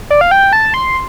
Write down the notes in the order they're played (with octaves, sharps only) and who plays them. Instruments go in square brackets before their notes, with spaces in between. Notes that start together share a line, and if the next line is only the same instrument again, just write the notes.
[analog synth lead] D5
F5
G5
A5
C6